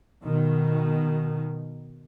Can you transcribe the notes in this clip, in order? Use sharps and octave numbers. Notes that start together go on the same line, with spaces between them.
B2 D#3